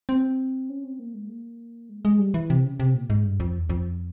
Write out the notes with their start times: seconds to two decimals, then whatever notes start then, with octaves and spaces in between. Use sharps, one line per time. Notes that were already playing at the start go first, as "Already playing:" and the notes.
0.09 C4
0.69 C#4
0.84 C4
0.99 A#3
1.14 G#3
1.29 A#3
1.89 G#3
2.05 G#3
2.19 G3
2.34 E3
2.50 C3
2.65 C#3
2.80 C3
2.94 A#2
3.10 G#2
3.24 G2
3.40 F2
3.58 E2
3.70 F2